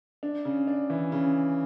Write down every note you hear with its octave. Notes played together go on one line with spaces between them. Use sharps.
D4
C#3
D4
E3
C#3